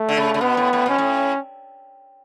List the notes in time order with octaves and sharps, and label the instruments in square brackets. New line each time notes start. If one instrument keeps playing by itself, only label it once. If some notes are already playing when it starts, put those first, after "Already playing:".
Already playing: [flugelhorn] A3
[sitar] D3
C#3
C#3
[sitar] B2 [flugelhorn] B3
[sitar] A2
A2
[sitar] B2 [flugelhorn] C#4
[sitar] A2